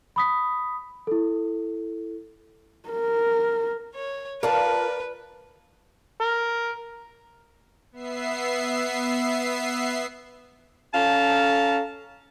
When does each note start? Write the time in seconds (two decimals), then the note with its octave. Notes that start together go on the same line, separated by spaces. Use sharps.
0.16 B5 D#6 B6
1.07 E4 A4
2.89 A#4
3.95 C#5
4.43 F4 A#4 B4 D5 A5
6.20 A#4
7.92 B3 E5 C7
10.94 C#4 A4 F5 A5 A#5